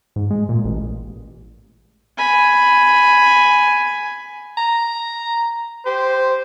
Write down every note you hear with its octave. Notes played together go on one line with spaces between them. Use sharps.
G#2
G#3
A#2
A1
G#5 B5
A#5
G4 C5